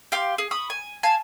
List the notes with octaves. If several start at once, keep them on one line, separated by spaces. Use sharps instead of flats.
G4 F5 C6
G#4
B5 C#6 D#6
G#5
F5 G#5 A5